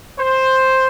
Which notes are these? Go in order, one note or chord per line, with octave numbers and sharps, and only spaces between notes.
C5